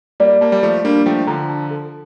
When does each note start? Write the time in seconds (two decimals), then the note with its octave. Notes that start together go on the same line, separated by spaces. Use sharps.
0.20 G3 A#3 D5
0.41 G3 A#3 A5
0.52 G3
0.63 F3 A3 D5
0.84 G3 A#3 D4
1.06 F3 A3 G5
1.27 D3 F3 A#5
1.49 A5
1.71 A4